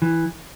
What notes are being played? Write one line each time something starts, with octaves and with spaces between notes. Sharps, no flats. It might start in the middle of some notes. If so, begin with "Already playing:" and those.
E3